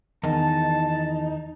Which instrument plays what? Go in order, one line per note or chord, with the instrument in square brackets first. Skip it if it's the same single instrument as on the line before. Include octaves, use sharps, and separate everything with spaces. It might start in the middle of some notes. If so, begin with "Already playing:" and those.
[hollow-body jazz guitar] E2 [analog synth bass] D#3 [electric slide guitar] D#4 [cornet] A5